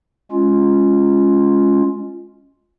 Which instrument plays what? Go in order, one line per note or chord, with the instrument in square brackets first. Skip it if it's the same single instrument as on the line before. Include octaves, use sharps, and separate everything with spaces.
[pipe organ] G#3 C#4 F4